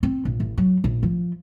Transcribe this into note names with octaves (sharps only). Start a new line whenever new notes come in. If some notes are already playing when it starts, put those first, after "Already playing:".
C4
A#1
A1
F#3
A#1
F3